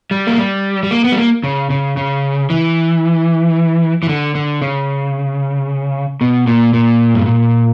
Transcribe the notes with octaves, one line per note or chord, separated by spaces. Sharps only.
G3
A#3
G3
G3
A#3
B3
G3
A#3
C#3
C#3
C#3
E3
E3
D3
D3
C#3
B2
A#2
A#2
G2
A#2